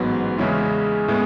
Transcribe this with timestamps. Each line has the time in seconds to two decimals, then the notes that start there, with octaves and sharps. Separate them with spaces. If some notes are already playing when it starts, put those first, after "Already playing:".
Already playing: A1 G#2 F#3 B3
0.38 E2 C#3 G#3 C#4 E4
1.08 A2 G#3 B3